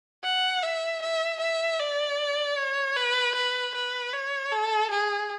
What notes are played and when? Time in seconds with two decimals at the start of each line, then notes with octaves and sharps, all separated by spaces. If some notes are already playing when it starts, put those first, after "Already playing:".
0.24 F#5
0.63 E5
1.02 E5
1.40 E5
1.79 D5
2.57 C#5
2.96 B4
3.35 B4
3.75 B4
4.13 C#5
4.52 A4
4.91 G#4